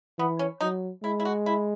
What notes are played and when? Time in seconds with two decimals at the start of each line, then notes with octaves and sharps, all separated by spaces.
0.18 E3 B3
0.39 C#4
0.61 F#3 D#4
1.03 G#3 E4
1.20 E4
1.25 F#4
1.46 E4